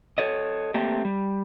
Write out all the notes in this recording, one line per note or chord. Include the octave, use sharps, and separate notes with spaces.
A4 C#5 D#5
A3 A#3 C4 G4
G3